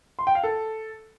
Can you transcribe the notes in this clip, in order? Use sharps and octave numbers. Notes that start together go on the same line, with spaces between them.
C6
G5
F5
A4